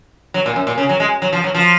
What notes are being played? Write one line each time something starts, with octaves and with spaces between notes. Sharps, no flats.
F#3
A#2
F#2
A#2
C#3
F#3
G#3
F#3
F3
F#3
F3